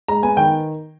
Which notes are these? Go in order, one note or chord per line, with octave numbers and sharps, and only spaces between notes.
G#3 A#5
B3 G#5
D#3 G5